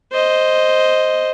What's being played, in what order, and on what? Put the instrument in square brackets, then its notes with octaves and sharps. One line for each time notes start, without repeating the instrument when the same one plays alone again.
[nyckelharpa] C5 D#5